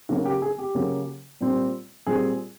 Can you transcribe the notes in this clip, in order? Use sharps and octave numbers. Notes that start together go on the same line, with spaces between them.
C#3 F#3 A#3 C#4 F#4
G4
G#4
G4
C#3 F#3 A#3 C#4
A#2 G3 C4
A#2 G3 C4 G#4